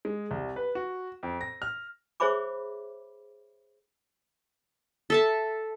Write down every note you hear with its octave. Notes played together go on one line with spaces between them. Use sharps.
G#3
C2
B4
F#4
F2
A#6
F6
G#4 C5 C#5 E5 B5 D6
A4 E5 A5